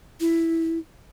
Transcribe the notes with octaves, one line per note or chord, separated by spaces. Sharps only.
E4